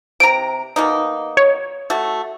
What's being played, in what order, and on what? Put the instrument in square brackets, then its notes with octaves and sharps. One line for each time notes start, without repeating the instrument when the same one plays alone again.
[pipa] C3 A#5 [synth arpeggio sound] D7
[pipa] B2 A#3 D#4
[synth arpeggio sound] C#5
[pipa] A3 F#4